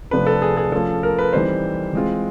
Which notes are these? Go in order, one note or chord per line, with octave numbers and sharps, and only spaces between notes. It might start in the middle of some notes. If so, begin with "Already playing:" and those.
C3 F3 A3 D4 B4
A4
G#4
G#4
F3 A3 C#4 F4 A4
A#4
B4
E3 G3 C4 D#4 C5
E3 G#3 C4 F4